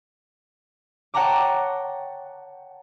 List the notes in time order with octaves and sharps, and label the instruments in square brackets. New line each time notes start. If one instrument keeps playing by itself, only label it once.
[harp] C#5 F#5 G5 A5 A#5 D6